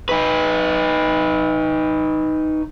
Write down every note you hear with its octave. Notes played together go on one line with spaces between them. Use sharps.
D#4 B4